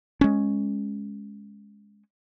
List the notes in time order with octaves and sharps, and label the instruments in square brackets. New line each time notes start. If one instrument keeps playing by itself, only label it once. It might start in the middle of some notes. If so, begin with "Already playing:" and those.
[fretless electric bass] G#3 C#4